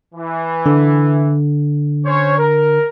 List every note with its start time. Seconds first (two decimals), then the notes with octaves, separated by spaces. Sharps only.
0.15 E3
0.66 D3
2.06 C#4 C5 C#5
2.38 A#4